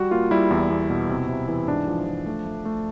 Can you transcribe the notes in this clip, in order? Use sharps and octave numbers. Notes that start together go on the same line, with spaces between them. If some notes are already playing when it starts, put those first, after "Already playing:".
Already playing: G3 F#4
A#3 F4
G3 E4
E2
E2
B2
C3
C3
E3
G#2 D4
F3
F3
A3
A3
A3